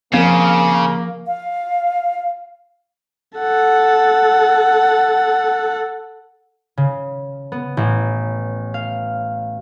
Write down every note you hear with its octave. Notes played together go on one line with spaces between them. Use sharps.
C#3 F3 A#3 C4 A#4
F5
A4 F#5
C#3
B3
A1
F5